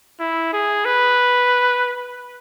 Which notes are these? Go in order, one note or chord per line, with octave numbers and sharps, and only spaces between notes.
E4
G#4
B4